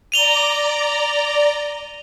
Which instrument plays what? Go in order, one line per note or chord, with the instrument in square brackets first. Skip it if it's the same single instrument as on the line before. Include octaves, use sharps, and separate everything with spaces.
[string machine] D5 A#5 [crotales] D#7 F7 G7